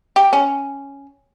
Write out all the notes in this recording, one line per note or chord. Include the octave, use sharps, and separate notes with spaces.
G4
C#4